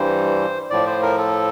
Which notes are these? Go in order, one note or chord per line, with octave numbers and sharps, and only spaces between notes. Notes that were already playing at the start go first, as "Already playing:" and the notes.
Already playing: G2 E3 G3 C5
A2 F3 D5
C5
A#4
A4